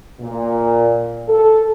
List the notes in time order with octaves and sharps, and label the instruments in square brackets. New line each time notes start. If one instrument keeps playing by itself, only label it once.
[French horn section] A#2
A4